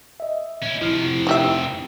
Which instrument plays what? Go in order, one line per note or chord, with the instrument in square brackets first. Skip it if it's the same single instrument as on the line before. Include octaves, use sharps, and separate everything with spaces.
[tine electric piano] D#5 E5
[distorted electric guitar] C#4 E4
[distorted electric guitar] C3 F3 [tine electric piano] E4 F6
[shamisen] D#4 G4 E5